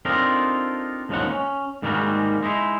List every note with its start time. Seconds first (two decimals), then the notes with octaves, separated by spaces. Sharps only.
0.05 C4 D4 D#4 F4 A4 A#4
1.09 D#2 G#2 F3 C#4 D#4 F#5
1.31 C#4
1.82 G#2 D#3 G3 G#3 A#3 F#4
2.43 G#3 D#4 E4